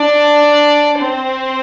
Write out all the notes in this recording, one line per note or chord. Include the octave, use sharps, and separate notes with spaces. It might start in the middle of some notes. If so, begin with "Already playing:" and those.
Already playing: D4 D5
C4 C5